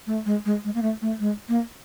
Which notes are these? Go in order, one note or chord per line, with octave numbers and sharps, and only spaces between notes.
A3
G#3
G#3
G#3
A#3
A3
A3
G#3
A#3